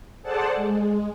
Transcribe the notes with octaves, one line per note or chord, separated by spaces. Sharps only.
G#4 A4 C5 D5 F#5 A5
G#3